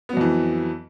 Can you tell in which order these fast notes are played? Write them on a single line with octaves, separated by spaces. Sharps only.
B3 F#3 F2 E3